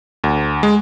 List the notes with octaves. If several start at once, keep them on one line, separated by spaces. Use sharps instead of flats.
D2
G#3